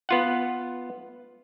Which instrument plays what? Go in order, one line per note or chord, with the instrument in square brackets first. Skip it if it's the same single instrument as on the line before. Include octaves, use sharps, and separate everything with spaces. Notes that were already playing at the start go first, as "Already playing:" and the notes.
[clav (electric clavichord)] B3 F4 F#5